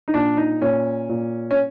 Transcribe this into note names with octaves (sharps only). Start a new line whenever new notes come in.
D#4
A#2 D4
D#4
A#2 C#4
A#2
C#4